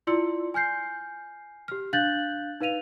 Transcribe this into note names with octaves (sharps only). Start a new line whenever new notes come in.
E4 F4 D5 C6 E6 C#7
G#5 F6 G6 C7
G4 F6
D4 F5 F#6 G6 A6 F#7
D#4 B4 F5 D#7 F7